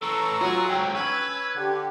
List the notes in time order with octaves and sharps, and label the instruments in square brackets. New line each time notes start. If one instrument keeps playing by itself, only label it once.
[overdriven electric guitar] A2 E3 [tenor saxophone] A4 [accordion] A#5 C#6 E6
[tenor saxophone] F#3 [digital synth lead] F4 [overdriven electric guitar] G#4
[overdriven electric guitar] G#2 D3 [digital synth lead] G5
[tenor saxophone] C#4 [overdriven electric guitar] B4 [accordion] E6 [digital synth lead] G#6
[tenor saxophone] D3 [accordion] G4